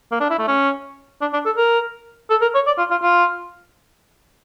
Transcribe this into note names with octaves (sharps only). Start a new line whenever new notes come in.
A#3
D4
E4
A3
C#4
D4
D4
A4
A#4
A4
A#4
C#5
D5
F4
F4
F4